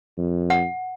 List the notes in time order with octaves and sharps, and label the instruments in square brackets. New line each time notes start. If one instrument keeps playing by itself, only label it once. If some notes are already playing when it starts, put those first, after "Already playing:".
[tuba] F2
[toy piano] F#5